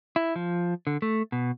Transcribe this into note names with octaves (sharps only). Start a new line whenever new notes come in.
E4
F3
D3
A3
B2